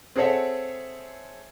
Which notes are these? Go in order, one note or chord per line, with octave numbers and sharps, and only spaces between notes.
C4 G#4 A4 C#5 E5 F#5